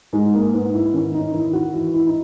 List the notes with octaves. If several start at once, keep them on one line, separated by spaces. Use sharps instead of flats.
G#2 G#3
A#3
G#2 B3
E4
D#3 C#4
D#4
D#3 E4
F#4
E3 E4
E4
D#4